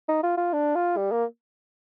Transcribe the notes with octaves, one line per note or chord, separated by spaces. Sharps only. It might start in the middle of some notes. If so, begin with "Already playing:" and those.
D#4
F4
F4
D4
F4
G3
A#3